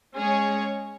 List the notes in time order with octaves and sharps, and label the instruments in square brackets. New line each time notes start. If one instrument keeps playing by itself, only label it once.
[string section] G#3 C#4 G#4 C#5